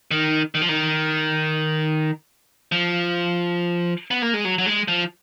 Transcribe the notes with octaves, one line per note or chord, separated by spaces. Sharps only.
D#3
D#3
F3
D#3
F3
B3
A#3
G#3
F#3
F#3
G#3
F3